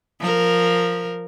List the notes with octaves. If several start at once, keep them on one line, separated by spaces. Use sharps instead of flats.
F3 A#4